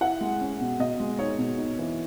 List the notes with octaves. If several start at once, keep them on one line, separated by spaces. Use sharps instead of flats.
E4 F#5
G#3
C#4
B2
B2 D#5
G#3
D#4 C#5
B2
D#4
E3